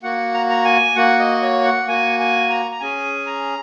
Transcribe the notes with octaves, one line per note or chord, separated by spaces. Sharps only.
A#3 F#4 F#5
A#5
A#5
G#5
A#3 F#4 F#5
D#5
C#5
F#5
A#3 F#4 G#5
G#5
A#5
A#5
C#4 G#4 G#5
A#5